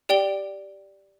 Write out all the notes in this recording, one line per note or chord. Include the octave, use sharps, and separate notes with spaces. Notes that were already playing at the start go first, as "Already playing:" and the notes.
G4 D5 G5 D7 G7